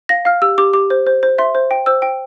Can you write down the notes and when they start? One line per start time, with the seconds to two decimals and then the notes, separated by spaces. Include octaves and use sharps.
0.09 F5 A#6
0.25 F5 F6
0.42 G4 E6
0.58 G4 D6
0.73 G4 D6
0.90 C5
1.07 C5
1.23 C5
1.38 E5 C6
1.55 C5
1.71 G5
1.86 C5 E6
2.02 G5